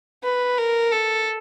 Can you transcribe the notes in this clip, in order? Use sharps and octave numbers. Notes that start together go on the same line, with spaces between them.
B4
A#4
A4